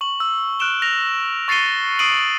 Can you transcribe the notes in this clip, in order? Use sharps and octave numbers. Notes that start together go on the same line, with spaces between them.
C#6 F#7
E6
F6 F#6 D7 E7 G7
F6 A#6 F7
C#6 A6 C7 C#7 D#7 G7
D#6 C7 D7 D#7 F#7